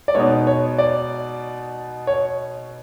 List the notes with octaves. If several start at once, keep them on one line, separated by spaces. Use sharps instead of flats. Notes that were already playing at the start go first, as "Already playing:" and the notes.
D5
B2 G#3 B3 D#4 C#5
C#5
D5
C#5